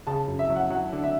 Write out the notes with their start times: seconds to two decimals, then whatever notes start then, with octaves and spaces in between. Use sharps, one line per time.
0.07 C#3 A5
0.28 F#2
0.39 E5
0.50 F#3
0.56 F#5
0.70 F#3 F#5
0.93 D3
1.03 E5